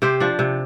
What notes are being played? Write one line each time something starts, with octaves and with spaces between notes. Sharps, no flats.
C3 G4 C5
F3 D4
C3